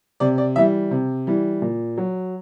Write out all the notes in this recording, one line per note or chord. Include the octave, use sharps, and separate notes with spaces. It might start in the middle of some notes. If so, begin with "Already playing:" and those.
C3 D5
D5
E3 G3 E5
C3
E3 G3
A#2
F#3